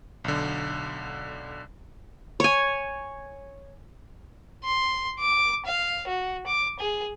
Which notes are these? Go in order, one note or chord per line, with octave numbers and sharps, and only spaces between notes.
B1 D3
C#5 G#5
C6
D6
F5
F#4
D6
G#4